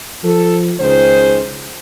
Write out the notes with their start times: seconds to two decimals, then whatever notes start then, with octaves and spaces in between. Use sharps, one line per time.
0.24 F3 A4
0.80 C#2 D#3 G#4 C5